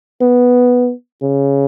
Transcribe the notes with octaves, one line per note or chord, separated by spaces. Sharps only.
B3
C#3